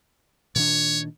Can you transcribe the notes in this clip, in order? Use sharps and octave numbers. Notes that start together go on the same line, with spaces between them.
A#2 D#3 D4 C#5